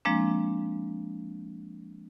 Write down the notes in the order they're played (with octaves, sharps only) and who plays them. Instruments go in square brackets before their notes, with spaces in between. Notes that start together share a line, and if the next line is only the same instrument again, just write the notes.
[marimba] F3 G#3 A#3 C4 D4